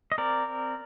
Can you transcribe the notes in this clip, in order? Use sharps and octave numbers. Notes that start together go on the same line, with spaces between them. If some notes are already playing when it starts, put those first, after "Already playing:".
D#5
C4 A#4 D5